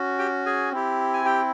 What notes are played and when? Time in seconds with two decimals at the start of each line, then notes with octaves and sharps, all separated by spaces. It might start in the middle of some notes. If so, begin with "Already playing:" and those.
Already playing: C#4 F#4
0.19 G4 G5
0.46 G#4 G#5
0.72 C4 E4 G4
1.14 G#5
1.25 G4 G5